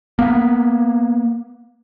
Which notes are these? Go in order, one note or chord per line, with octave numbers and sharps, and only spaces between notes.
A#3 B3